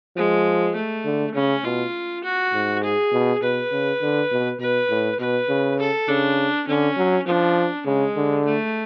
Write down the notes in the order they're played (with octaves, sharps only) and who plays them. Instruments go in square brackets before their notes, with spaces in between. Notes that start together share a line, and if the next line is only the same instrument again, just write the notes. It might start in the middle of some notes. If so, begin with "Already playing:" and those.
[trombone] F3 [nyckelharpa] G#3
[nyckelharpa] A3
[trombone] D3
[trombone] C#3 [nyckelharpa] C#4
[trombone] B2 [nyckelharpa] F4
[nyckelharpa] F#4
[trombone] G#2
[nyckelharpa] G#4
[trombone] B2
[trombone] B2 [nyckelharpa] B4
[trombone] C#3
D3
B2
[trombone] B2 [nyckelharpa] B4
[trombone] A2
[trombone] B2 [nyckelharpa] B4
[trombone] C#3
[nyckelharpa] A4
[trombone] C#3 [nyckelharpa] D4
[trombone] D3 [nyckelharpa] C#4
[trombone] F#3
[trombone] F3 [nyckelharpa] D4
[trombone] C#3 [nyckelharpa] G#3
[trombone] D3
[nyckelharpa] A3